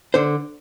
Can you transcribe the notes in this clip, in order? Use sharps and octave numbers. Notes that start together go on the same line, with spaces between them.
D3 C5